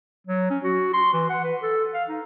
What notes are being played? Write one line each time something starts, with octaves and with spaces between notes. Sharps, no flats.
F#3
C#4
F#4
C6
E3
F#5
B4
A4
F5
D#4